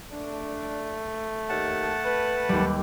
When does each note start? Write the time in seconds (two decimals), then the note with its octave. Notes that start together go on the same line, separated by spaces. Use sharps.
0.12 A3 D4
1.49 D#2 F#5 A5
2.05 B4
2.49 D#2 G3